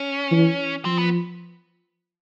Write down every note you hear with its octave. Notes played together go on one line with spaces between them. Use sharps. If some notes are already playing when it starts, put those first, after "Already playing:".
Already playing: C#4
E3
F3 C4
B3